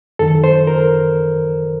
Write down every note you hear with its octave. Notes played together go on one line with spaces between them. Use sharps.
F#2 D#3 A4
C5
A#4